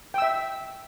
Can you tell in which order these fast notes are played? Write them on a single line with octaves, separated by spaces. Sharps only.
G5 E6 E5